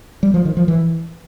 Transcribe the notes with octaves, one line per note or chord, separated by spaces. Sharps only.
G3
F3
D#3
F3
E3